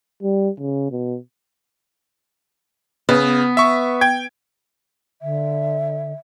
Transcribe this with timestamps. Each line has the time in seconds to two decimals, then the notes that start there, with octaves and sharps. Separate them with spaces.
0.23 G3
0.59 C#3
0.91 B2
3.09 C#3 B3
3.57 E5 C#6
4.01 G5 G#6
5.22 D3 E5